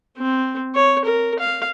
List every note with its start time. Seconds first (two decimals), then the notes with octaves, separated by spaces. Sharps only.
0.18 C4
0.75 C#5
1.05 A#4
1.39 F5